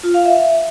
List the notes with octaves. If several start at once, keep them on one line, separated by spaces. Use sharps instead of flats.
F4
F5
E5